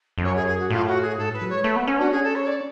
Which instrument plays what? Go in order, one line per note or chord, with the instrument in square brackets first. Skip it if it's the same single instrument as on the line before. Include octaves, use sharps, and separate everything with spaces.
[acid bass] F2
[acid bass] F#2 [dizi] C#5
[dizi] G#4
G#4
F#4
[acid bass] A2 [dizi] F4
[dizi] F#4
G#4
[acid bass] G#2 [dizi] A4
[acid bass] A2 [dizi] B4
[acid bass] F#3
[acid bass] G#3 [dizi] C#5
[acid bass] A3 [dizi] B4
[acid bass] B3
C#4
[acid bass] D4 [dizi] F#4
[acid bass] C#4 [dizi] G#4
[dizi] A4
C#5
D5